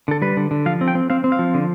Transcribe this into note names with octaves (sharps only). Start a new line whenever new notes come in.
D3 A4
G3 B4
D3
D3
F3 F5
C4
G5
C4
C4 F5
C4
F5
F3
D3